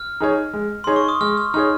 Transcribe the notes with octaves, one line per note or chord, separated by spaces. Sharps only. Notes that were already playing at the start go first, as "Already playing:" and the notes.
Already playing: F6
D#4 G#4 C#5
G#3
D#4 G#4 C#5 C6
C#6
D#6
G#3 F6
F6
D#4 G#4 C#5 F6